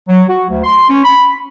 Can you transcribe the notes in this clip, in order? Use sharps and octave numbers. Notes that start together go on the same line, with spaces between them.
F#3
F#4
D2
C6
C#4
B5